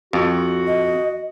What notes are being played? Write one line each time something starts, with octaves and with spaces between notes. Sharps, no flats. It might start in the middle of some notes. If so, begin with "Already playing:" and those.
F2 F#4
D#5